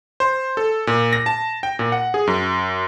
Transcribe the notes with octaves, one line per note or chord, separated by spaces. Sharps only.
C5
A4
A#2
A#6
A5
G5
A#2
F#5
G#4
F#2